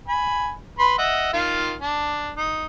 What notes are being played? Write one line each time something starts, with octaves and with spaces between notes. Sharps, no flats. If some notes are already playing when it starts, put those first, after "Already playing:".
G#5 B5
B4 B5 C6
D#5 E5 F#5
D#3 F4 F5
D4
D#4